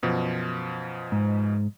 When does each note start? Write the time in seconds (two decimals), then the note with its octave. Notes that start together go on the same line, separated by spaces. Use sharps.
0.03 F#2 B2 F3
1.12 G#2